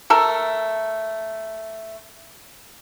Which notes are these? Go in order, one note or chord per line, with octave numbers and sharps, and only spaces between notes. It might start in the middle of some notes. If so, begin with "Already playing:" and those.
A3 A4 A#4